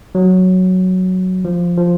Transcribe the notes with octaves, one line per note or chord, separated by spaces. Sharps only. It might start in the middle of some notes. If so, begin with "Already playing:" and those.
F#3
F3
F3